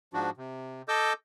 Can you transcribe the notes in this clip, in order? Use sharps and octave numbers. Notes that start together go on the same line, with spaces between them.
G#2 F3 D4 F#4
C3
A4 D#5 D6 E6 G6